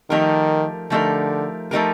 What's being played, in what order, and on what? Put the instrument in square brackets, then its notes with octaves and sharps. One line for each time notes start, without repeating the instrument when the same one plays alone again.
[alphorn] D#3 [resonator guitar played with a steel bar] F3 A3 D#4 G4 A#4
[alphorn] D3 [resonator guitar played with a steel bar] F3 A3 D#4 G4 A#4
[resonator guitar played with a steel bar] F3 A3 D#4 G4 A#4